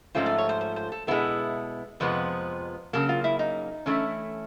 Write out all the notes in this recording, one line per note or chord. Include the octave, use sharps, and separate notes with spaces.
G#2 F3 A3 C#4 F4 C5
D5
C#5
C5
C5
C5
A4
B2 G#3 B3 E4 A4
F2 C3 F3 G#3 B3 B4
C#3 F#3 A#3 A4
F4
E4
D#4
E3 A3 C#4 E4